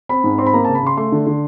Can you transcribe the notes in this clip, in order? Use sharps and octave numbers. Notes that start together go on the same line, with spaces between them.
C4 B5
G#2
C4 C6
B5
A#3 A#5
C#3 A5
B5
C#3 C6
A3 C6
D3
D3